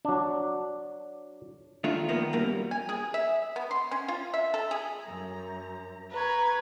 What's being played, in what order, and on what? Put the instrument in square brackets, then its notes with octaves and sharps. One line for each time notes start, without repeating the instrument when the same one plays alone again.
[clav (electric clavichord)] F#3 D4
[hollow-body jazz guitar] D#3 A3 D4 F4
D#3 F3 A#3 B3
F#2 G3 A#3
[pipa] G#5
G#4
E5
B3
C6
C#4
F4
E5
A4
G#4
[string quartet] F#2 A#5
[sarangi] B4 [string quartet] A#5 C#6 G#6